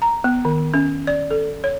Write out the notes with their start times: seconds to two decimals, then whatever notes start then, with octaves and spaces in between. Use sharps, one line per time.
0.02 A#5
0.24 B3
0.45 D#3
0.74 C#4
1.07 D5
1.31 A4
1.64 C#5